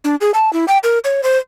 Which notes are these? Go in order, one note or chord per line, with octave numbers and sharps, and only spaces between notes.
D4
G#4
A5
E4
G5
A#4
C#5
C5